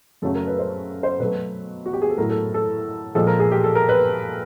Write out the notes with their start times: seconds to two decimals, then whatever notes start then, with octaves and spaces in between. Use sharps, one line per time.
0.22 F#2 C#3 F#3 A3 A4
0.35 A#4
0.47 B4
0.59 C5
1.03 C5
1.20 B2 F#3 A3 B4
1.86 F#4
1.93 G4
2.02 G#4
2.10 A4
2.18 A2 F#3 A3 A#4
2.30 A4
2.54 A4
3.15 A#2 F3 G#3 A4
3.27 A#4
3.39 G#4
3.52 G4
3.64 A4
3.75 A#4
3.89 B4